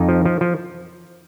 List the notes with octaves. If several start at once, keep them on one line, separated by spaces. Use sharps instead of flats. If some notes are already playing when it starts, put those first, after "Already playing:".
Already playing: F2 D#4
F3
F3
F3